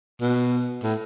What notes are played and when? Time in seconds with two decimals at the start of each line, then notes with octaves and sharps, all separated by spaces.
0.21 B2
0.83 A2